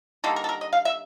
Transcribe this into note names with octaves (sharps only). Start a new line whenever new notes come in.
D3 G3 A#3 D#4 A4
A#4
A4
A#4
D#5
F5
E5